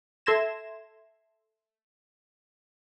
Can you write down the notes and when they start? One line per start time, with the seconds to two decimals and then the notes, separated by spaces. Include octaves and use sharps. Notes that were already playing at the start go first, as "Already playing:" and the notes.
0.26 A4 E5 C6 G#6 A#6 E7